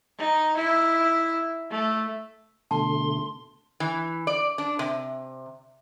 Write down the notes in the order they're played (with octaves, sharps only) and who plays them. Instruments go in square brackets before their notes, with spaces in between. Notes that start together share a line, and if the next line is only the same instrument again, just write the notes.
[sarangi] D#4
E4
A3
[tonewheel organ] B2 D3 A3 [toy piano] A5 [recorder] C6
[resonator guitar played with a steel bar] E3
D5
D4
C3